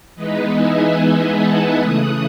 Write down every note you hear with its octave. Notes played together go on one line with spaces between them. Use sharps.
E3 G#3 B3 D#4 B4 D#5
E5 G#5
E5 G#5
F#5 A5
C#3 E3 A3 D#6 F#6